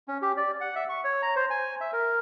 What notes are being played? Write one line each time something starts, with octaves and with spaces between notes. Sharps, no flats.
C#4
G4
D5
F#5
E5
C#6
C#5
A#5
C5
G#5
E5
A#4